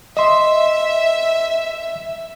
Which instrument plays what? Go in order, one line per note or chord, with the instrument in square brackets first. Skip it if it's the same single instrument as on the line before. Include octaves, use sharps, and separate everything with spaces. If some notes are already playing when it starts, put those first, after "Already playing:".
[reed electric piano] D#5 C6 [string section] E5